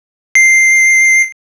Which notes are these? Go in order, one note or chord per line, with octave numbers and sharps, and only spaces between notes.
C7